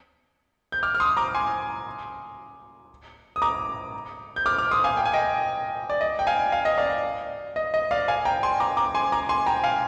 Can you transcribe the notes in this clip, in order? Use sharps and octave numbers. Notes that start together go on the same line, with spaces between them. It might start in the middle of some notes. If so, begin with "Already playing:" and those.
G6
D6 F6
F6
C6 D#6
A#5 D6
G#5 C6
D#6
A#5 D6
G6
D6 F6
D6 F6
C6 D#6
F5 G#5
G5
G#5
D#5 G5
D5
D#5
G5
F5 G#5
F5
D#5
D5 F5
D#5
D#5
D5 F5
F5 G#5
G5 A#5
G#5 C6
A#5 D6
A#5 D6
G#5 C6
A#5 D6
G#5 C6
G5 A#5
F5 G#5